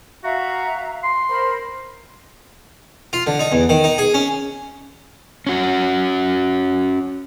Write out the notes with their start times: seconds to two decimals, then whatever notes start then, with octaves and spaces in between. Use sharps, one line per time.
0.24 F#4 E5 F5 A#5
1.03 C6
1.29 A#4 C5 B5
3.13 F4
3.27 D3
3.39 D#4
3.52 E2
3.69 D#3
3.84 D#4
3.98 G#4
4.14 C#4
5.47 C#4 F#4